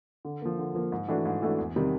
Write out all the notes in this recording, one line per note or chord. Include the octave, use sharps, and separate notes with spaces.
D3
F3 A#3
D3
F3 A#3
G#2
E3 A3 D4 F#4
G#2
E3 A3 D4 F#4
E2
C3 D#3 G3